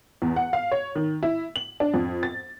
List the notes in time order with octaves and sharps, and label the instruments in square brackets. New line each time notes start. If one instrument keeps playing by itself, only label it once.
[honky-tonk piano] E2
F#5
F5
C#5
D#3
E4
F#7
D4
F2
A6